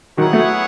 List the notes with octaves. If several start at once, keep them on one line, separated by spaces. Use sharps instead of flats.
D#3 F#3 B3 E4 G#4 C#5 F#5
F#3 A3